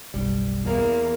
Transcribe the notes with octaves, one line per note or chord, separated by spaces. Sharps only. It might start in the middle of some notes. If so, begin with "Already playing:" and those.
F#1 B1 G3
E2 A#3